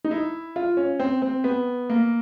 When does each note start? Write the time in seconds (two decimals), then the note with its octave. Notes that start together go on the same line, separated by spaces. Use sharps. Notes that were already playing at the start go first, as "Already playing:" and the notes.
0.05 D#4
0.11 E4
0.56 F4
0.77 C#4
1.00 C4
1.22 C4
1.44 B3
1.90 A#3